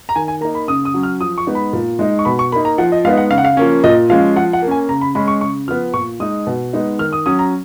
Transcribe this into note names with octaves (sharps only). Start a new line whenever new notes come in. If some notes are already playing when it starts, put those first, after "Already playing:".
A#5
D#3 G#5
G#5
A#3 D#4 A#5
B5
C#3 D#6
D#6
F#3 C#4
F6
F3 D#6
C#6
G#3 B3 D#4
B5
A#2
G#3 D#4
C#6
B2 B5
C#6
A#3 D#4 B5
A#5
F3 F#5
D#5
G#3 B3 D#4 F5
F#5
C#3 F5
F#5
F5
F3 A#3 C#4
A#2 D#5
F3 G#3 C#4 F5
F3 F#5
F#5
A#3
C#4 G#5
C#3 A#5
B5
G#3 C#4 B5
C#6
C#3 C#6
F3 B3 F6
A#2 C#6
G#3 D#4 D#6
B2
G#3 B3 D#4
D#3 F6
D#6
F#3 C#4 D#6
A#5